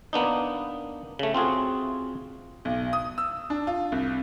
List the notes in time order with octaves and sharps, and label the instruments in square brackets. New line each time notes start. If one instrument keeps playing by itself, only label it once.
[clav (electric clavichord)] A#3 B3 D4 D#4
C#3 A3
C4 F4 F#4 G#4
[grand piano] B1
D#6
E6
D4
F4
C2